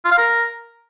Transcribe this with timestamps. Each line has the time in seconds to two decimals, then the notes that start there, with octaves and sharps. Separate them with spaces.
0.05 F4
0.12 F5
0.18 A#4